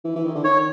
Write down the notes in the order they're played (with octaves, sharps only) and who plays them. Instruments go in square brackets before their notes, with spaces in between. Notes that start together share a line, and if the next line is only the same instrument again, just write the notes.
[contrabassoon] E3
E3
D#3
D3
[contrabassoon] D#3 [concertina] C#5